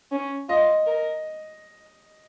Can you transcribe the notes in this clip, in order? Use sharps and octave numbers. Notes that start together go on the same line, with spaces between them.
C#4
F4 D#5
A#4